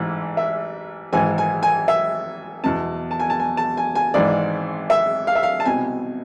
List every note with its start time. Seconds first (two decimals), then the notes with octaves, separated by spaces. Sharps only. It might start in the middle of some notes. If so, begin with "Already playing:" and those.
Already playing: A1 G#2 E3
0.37 E5
1.13 G#1 G#2 E3 G#5
1.38 G#5
1.63 G#5
1.88 E5
2.64 E2 B2 A5
3.11 A5
3.20 G#5
3.30 A5
3.40 G#5
3.57 A5
3.77 G#5
3.95 G#5
4.14 G#1 G#2 E3 D5
4.90 E5
5.27 F5
5.35 E5
5.43 F5
5.60 A5
5.65 C2 B2 G#5